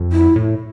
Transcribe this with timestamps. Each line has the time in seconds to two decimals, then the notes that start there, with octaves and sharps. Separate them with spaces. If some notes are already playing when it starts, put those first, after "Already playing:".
Already playing: F2
0.12 E4
0.36 A2